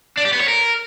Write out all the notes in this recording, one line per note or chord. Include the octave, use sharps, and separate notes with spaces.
D4
G4
B3
C#5
A#4